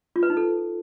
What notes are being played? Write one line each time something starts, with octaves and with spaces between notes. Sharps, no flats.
F4
B4
D#4
A4